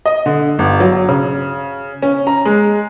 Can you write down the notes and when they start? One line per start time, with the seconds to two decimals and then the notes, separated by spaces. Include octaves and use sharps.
0.06 D#5
0.26 D3
0.59 G1
0.80 F#3
1.09 C#3
2.02 C#4
2.27 A#5
2.45 G#3